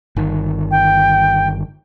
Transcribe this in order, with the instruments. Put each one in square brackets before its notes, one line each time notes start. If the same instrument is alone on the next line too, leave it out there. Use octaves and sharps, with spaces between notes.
[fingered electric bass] G1 D#3
[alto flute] G5